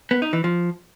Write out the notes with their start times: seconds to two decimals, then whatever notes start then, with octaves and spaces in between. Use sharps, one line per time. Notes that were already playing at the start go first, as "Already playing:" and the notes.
0.11 B3
0.22 D#4
0.33 E3
0.44 F3